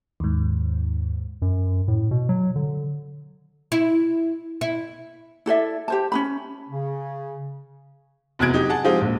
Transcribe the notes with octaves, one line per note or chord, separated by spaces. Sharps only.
D#2 G#2
F#2
A2
B2
F#3
D3
E4
E4
E4 A4 D5 E5
G4 C5 A5
C#4 D#4 B5
C#3
F1 E2 F#4 F#6 G#6 D7
F#3 D#4 F#4 G4
G#4 F#5 A5
F3 G#3 C4 D#4 F4 G4
A#1 D#2